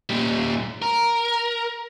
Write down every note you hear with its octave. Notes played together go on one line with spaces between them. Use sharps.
A#2 G3
A#4